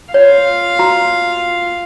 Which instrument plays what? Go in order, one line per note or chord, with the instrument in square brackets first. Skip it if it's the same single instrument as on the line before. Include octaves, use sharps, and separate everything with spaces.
[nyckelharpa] F4 F5 [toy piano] C#5
[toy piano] F#4 A#5